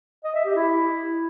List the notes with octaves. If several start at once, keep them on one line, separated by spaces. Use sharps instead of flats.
D#5
E5
G4
E4